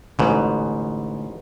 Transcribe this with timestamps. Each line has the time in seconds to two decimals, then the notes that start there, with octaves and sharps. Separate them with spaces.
0.19 A1 G#2 B2 D3 A3